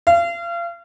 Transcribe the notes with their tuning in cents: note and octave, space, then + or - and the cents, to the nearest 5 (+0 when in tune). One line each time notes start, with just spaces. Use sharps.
F5 -35